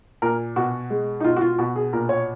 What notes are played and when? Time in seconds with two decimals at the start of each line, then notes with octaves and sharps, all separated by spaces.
0.22 A#2 A#4
0.56 B2 F#4
0.90 G#3
1.20 D#4
1.24 B2 F4
1.36 F#4
1.41 F4
1.58 B2 F#4
1.76 G#4
1.93 A#2 A#4
2.09 C#5